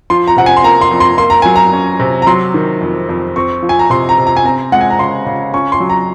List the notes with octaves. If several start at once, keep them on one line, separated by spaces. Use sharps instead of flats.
F3 C6
A#5
C3 F#5
G#5
C6
A#3 A#5
C6
F2
C6
A#3 C6
A#5
F#3 G#5
A#5
C#4
C3
A#5
F#3 C6
D#3
F2
F2
C4 C#6
F3
G#5
A#5
C3 C6
A#5
C3
A#5
G#5
C4 A#5
G#3 F#5
G#5
A#5
C#3 C6
C#3
C#4 C#6
C6
F#3
A#5